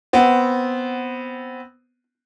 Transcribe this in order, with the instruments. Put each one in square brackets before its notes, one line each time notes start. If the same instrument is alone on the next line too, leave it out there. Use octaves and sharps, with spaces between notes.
[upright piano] B3 C4